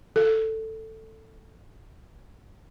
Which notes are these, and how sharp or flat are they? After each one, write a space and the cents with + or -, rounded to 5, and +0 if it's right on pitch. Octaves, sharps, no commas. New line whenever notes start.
A4 +10